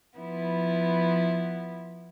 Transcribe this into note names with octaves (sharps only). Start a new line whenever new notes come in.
F3 B3 E4